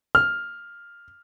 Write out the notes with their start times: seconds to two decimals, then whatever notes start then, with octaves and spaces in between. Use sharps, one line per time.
0.15 F6